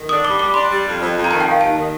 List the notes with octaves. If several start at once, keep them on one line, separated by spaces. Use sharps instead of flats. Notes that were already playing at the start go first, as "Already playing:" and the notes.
Already playing: D#3
D4 D#6
G3 D6
G3 D6
D4 C6
G3
F2
F2
F2
A#5
D#3 A5
D#3 G5
F5
D#2 A5
D#3